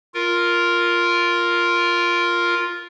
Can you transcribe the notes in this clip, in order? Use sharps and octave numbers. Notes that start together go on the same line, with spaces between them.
F4 A#4